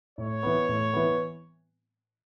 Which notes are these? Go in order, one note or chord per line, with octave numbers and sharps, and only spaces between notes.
A2 C#5
E3 B3
A2
E3 B3